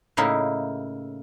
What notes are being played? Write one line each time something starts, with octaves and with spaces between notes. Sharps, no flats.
A2 C#3 A#3 D#4 E4